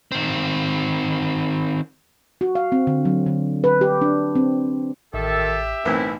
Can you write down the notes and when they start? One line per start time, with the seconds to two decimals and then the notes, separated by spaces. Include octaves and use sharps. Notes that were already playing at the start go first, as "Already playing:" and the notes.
0.12 D#3 C4
2.41 F#4
2.55 F5
2.72 C4
2.87 D3
3.05 F#3
3.26 D3
3.64 B4
3.81 G4
4.02 D4
4.35 C4
5.14 A1 D#3 G4 A4 E5
5.85 B1 A2 E3 C4 E4 A#4